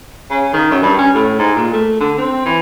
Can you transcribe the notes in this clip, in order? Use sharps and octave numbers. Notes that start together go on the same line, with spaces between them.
C#3
D#3
F#2
G2
C#4
A2
G#2
A#2
A3
D3
C4
E3